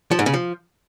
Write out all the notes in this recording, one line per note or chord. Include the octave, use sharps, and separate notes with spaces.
F3
G#2
C#3
F3